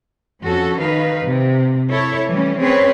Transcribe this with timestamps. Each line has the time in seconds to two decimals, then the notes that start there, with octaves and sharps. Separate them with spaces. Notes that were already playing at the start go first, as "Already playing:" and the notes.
0.42 F2 C#4 F#4 A4
0.79 D#3 D#4 B4 F5
1.26 C3
1.90 E4 A4 C#5
2.29 E3 G3 A3 C#4
2.61 C4 C#4 G#4 B4 C#5